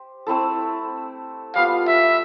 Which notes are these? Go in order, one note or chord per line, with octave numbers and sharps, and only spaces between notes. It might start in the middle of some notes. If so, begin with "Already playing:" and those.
Already playing: G4 C5
A3 C4 E4 A4
G3 B3 F4 F5
E5